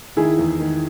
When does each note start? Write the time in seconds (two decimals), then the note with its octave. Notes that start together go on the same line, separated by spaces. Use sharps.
0.16 D#3 E4 G#4
0.38 E2
0.60 D#3